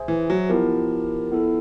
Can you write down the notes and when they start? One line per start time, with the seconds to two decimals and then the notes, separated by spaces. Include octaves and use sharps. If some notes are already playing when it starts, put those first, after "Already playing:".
Already playing: G#4 C5 E5 G#5
0.08 E3
0.30 F#3
0.49 F3 B3 E4 G4 A#4
1.32 B3 E4 A4